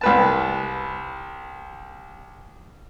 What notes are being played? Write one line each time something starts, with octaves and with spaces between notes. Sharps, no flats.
C2 B4 A5